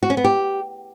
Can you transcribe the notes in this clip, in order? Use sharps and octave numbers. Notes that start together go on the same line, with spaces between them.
F#4
C#4
B3
G4